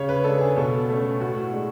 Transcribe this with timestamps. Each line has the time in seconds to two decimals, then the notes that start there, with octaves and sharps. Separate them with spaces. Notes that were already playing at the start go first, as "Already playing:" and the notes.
Already playing: C#3 C#5
0.09 B4
0.24 G#3 D4 A4
0.41 G#4
0.56 B2 A4
0.89 A3 C#4
1.20 A2 F#4
1.53 G#3 D4